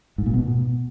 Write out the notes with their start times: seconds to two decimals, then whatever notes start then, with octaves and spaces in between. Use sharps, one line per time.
0.18 G#2
0.26 A#2
0.34 B2